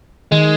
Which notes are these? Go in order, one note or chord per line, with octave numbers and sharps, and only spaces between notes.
D#3 G#3